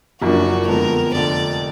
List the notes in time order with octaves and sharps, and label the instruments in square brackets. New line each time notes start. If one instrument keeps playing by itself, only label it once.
[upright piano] F#1 F#2 F3 A#3 D4 [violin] F#4
[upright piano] F2 D3 G#3 B3 [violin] A#4
[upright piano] F1 F2 D3 [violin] D5